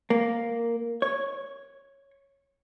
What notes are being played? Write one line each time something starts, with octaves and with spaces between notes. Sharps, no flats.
A#3
C#5